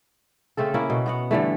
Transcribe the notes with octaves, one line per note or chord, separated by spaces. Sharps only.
C#3 A3 C4 A4
A#3 C#4 E4
B2
B3 F#4 F#5
G2 D3 E3 A3